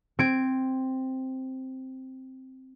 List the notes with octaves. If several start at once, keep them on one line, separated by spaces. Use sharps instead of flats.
C4 G#6 D7